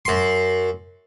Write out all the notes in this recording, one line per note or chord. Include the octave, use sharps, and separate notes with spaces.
F#2 C6